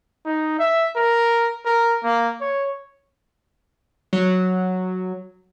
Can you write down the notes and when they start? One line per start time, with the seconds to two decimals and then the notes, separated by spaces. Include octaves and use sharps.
0.25 D#4
0.59 E5
0.96 A#4
1.65 A#4
2.04 A#3
2.41 C#5
4.13 F#3